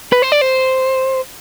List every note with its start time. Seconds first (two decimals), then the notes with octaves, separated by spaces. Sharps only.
0.12 B4
0.22 C5
0.32 D5
0.41 C5